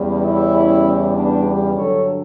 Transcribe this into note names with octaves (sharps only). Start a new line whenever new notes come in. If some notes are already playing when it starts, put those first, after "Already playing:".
Already playing: E2 C#3 G3
C#4 E4
B3 D4
G4 B4
G2 D3 F#3 A4 C#5